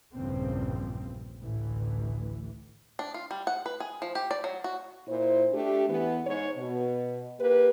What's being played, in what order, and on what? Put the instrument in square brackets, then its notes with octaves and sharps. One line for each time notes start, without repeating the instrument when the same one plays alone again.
[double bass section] A#1 E2 G2 C#3 F3 C4
A1 D2 E3
[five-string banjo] D4
F4
G3
F#5
B4
G#4
F3
G4
D5
F#3
F#4
[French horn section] A#2 E4 C5
A3 D4 G4
E2 E3 B3
G#2 C#5
B2
A#3 G4 B4